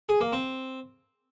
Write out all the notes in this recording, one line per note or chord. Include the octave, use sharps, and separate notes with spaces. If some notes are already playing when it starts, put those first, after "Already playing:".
G#4
A#3
C4